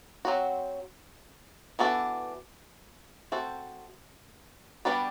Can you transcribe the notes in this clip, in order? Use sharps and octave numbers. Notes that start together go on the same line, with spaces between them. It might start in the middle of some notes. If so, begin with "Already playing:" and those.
F#3 C4 F#4
E3 B3 D4 F#4 A4
A3 C4 F#4 A4 C5
G3 B3 D4 F#4 B4